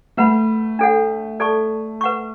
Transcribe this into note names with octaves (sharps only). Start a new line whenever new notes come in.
A3 B4 F#5 B5
D4 A4 C#5 F#5
A4 D5 A5 C#6
B4 F#5 C#6